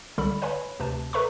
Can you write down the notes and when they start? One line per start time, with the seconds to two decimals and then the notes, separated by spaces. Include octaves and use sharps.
0.18 C#2 D3 G3 A4 B5
0.42 B4 C#5 F5 G#5 B5
0.80 D2 C3 B4 A5
1.13 A4 B4 E5 A#5 B5 C#6